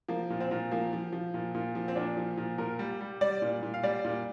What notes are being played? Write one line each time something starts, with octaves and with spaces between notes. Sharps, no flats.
F3 A#3
A#2
C4
A#2
F3 A#3
F3
F3
A#2
A#2
F3
C4
A#2 D4
F3
A#2
A#2 A#4
G3
G3
G3 D5
A#2
A#2
F5
G3 D5
A#2